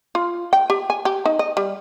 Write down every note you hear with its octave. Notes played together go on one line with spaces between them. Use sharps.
F4
G5
G4
G#5
G4
D#4
D#5
G3